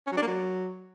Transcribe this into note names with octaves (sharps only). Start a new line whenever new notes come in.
C#4
F#3
D4
A#3
F#3